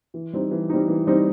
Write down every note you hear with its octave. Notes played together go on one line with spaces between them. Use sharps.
E3
G3 C4 D#4
E3
G3 C4 D#4
E3
G3 C4 D#4